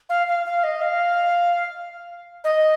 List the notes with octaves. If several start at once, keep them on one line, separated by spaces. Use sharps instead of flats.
F5
F5
F5
D#5
F5
D#5